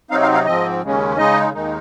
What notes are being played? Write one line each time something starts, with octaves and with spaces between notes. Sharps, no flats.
C3 F#3 C4 D#4 F5
F5
F5
G#2 F3 C4 D#5
D#2 C#3 G#3 C#4
C#3 G#3 D#4 D#5
D#2 D#3 G#3 D#4